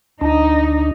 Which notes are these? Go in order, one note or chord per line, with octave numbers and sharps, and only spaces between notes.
D2 D4 D#4